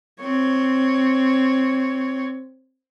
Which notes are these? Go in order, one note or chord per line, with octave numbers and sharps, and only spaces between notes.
C4 C#5